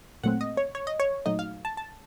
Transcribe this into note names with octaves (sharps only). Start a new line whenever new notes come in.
A#2 F#3 A3 C4 F#5
D#5
C#5
C#5
D#5
C#5
A#2 F#3 A3 D#4 D#5
F5
A5
A5